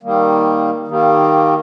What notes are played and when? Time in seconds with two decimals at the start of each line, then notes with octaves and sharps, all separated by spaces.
0.03 D#3 G3 A#3
0.87 D#3 G3 A#3